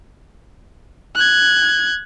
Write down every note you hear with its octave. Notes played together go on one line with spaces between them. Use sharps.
F#6 G#6